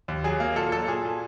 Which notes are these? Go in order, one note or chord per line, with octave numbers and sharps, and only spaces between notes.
D#2
F#3 G#4
A#3
A#2 A4
F#3 A4
A#2 G#4
A#2